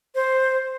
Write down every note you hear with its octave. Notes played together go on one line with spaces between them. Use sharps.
C5